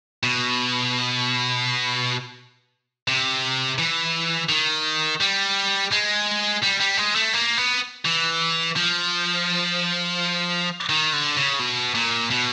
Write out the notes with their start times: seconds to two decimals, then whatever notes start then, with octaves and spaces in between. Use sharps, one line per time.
0.23 B2
3.08 C3
3.78 E3
4.49 D#3
5.21 G3
5.91 G#3
6.63 G3
6.81 G3
6.98 G#3
7.16 A3
7.34 A#3
7.57 B3
8.05 E3
8.76 F3
10.89 D#3
11.13 D3
11.37 C#3
11.60 B2
11.95 A#2
12.31 B2